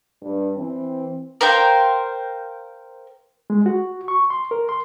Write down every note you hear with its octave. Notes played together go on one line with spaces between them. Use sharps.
G2
E3 C4
A#4 C5 F5 G5
G#3
F#4
C#6
C6
A#4
C6